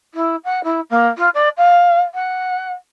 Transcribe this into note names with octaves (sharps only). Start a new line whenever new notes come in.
E4
F#5
E4
A#3
F4
D5
F5
F#5